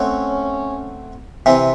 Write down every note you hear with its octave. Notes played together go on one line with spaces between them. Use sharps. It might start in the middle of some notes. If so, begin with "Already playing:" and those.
Already playing: A3 C4 C#4 F#4 C#5
C3 E3 C4